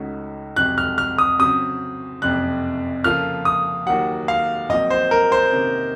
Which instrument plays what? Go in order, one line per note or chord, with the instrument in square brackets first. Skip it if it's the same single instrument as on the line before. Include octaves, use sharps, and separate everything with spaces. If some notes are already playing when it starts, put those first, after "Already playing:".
Already playing: [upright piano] C#2 C#3 A3 D#4 F#4
[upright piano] F2 C3 F#3 [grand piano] F#6
[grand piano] F6
F6
D#6
[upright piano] C#3 F#3 C4 [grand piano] D#6
[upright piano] F#1 F2 C3 [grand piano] F#6
[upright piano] C#3 F3 A#3 F4 A4 [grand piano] F6
[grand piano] D#6
[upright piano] D#2 D#3 F#3 [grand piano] F#5
[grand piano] F5
[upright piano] A#1 A#2 F#3 C4 [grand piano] D#5
[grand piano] C5
A#4
C5
[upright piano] C3 D#3 A#3 C#4